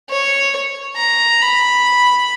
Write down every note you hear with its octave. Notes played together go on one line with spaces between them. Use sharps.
C#5
A#5
B5